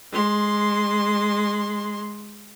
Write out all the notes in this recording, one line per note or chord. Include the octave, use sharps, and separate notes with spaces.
G#3 C6